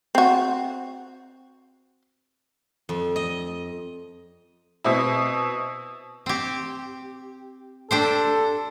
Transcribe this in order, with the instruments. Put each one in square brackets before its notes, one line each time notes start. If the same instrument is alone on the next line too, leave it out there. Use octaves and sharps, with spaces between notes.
[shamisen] C4 F#4
[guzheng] F2
D#5
[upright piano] B2 C4 E4
[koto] C4 G4
[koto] D4 G4 C5 [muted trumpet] A4